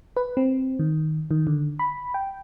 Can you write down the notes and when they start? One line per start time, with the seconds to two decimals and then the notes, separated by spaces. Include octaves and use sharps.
0.16 B4
0.37 C4
0.79 D#3
1.31 D#3
1.47 D3
1.79 B5
2.14 G5